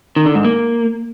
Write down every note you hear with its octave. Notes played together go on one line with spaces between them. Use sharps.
D#3
D3
G#2
A#3